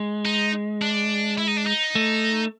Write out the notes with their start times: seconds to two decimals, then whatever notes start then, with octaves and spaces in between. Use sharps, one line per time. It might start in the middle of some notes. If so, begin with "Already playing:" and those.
Already playing: G#3
0.25 D#4
0.82 D4
1.38 E4
1.48 D#4
1.58 D4
1.67 D#4
1.95 A3